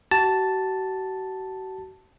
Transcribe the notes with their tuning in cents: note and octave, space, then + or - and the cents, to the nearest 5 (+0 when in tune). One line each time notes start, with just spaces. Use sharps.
F#4 +40 A5 +0